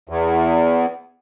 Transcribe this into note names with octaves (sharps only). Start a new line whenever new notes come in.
E2